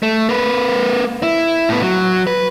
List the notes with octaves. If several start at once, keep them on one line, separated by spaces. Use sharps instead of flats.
A3
A#3 B4
E4
A2 B3
F#3
B4